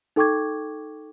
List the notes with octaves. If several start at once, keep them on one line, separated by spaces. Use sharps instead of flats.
D#4 A4 G5 C#6 D6 G#6